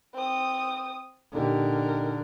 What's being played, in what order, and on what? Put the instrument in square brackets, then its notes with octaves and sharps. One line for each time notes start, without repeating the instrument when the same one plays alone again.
[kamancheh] C4 D#6
[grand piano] A#2 D#4 G4 [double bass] D3 [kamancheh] A#4